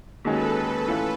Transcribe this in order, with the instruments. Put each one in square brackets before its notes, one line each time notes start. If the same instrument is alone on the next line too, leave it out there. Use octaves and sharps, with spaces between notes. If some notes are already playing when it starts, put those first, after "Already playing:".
[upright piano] D#2 D#3 G#3 C#4 F#4 [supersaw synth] A4 B4
[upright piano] A2 E3 A3 C#4 F4